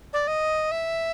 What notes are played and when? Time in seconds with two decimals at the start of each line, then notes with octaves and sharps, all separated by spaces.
0.13 D5
0.28 D#5
0.71 E5